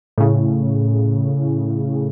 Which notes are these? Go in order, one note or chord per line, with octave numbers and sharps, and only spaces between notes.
A2 C#3